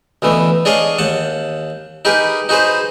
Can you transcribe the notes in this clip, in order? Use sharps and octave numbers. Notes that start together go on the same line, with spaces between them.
D2 B2 E3 B3
D4 G#4 C#5 D#5 F5
D#2 F#5 A5
D#4 G4 G#4 A#4 B4
D#4 F#4 G#4 B4 C5